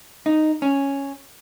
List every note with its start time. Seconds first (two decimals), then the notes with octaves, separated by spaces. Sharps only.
0.26 D#4
0.62 C#4